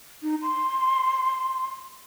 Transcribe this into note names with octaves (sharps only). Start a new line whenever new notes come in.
D#4
C6